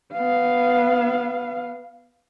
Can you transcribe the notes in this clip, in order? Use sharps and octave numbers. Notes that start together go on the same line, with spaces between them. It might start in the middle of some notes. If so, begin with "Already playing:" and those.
B3 F5